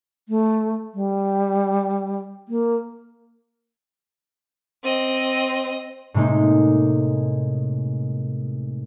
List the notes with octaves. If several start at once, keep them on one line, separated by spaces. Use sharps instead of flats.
A3
G3
A#3
C4 D#5
A2 C3 G#3 A#3 D#4